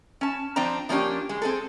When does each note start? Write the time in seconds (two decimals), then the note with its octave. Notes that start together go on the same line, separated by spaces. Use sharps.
0.21 C#4 A5
0.56 F3 C4 D4 G5 A#5
0.89 F3 A#3 C#4 D4 G4
1.29 G#3
1.42 C4 G#4 A4